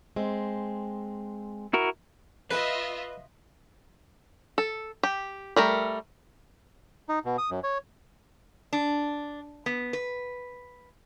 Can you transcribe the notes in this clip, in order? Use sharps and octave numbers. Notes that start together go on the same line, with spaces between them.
G#3 C4
E4 F#4 A#4
F4 B4 D#5 E5
A4
G4
G3 A3 A#4
D#4
B2
D#6
F#2
C#5
D4
B3
B4